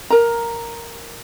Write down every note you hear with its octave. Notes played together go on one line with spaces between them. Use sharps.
A#4 A#5